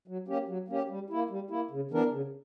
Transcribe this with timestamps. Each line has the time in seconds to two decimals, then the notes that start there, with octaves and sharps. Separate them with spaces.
0.08 F#3
0.28 A#3 C#4 G4
0.48 F#3
0.68 A#3 C#4 G4
0.89 G3
1.10 A#3 E4
1.30 G3
1.50 A#3 E4
1.71 C#3
1.91 E3 B3 D4 A#4
2.12 C#3